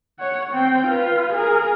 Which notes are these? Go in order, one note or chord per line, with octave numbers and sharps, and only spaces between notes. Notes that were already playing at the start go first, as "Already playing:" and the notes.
C#5 F#5
C4 G5
F4 B4
G#4 A#4